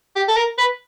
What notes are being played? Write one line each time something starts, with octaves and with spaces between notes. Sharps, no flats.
G4
A4
A#4
B4